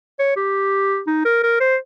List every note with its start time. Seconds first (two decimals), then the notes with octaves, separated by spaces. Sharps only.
0.19 C#5
0.37 G4
1.07 D#4
1.25 A#4
1.43 A#4
1.60 C5